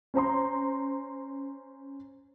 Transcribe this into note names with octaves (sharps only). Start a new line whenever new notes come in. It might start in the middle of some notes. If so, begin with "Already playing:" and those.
C#4 C5 A#5 C6